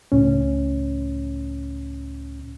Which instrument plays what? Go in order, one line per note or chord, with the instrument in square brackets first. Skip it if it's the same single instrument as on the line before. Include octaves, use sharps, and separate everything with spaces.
[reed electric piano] C#2 A2 C#4